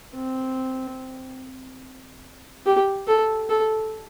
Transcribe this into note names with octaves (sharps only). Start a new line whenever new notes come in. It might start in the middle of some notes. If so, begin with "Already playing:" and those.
C4
G4
A4
A4